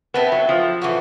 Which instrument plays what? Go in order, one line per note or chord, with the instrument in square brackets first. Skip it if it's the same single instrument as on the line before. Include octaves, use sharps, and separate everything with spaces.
[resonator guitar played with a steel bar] B3 [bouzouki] C4 E4 A4
[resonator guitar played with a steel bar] F#3
F3
[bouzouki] E3 A3 C#4 F#4